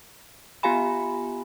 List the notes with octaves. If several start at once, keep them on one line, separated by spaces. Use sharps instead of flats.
B3 F4 G4 F5 G#5 B5